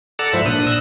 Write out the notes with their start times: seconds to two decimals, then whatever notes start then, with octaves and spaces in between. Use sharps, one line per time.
0.19 A4 D5 F#5 A5 A#5
0.33 G#2 F3 C5 E5 B5
0.46 A#2 D4 D#6 F#6
0.67 E6 F#6 A#6